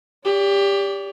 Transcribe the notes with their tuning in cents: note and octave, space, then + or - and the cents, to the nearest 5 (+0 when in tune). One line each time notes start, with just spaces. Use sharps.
G4 +20 D5 -35